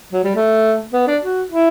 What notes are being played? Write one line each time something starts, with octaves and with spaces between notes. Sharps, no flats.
F#3
G3
A3
B3
D4
F#4
E4